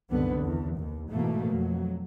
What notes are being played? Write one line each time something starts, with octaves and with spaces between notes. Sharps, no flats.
C2 F#2 D3 D#3 B3
E2
D#2
G#2 B2 E3 A3 A#3
F2 F#3